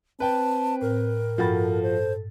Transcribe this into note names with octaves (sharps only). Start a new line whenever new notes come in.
C4 B4 G5 A5
A2 A#4
G2 F3 F#4 A4 G5 B5 A6
C5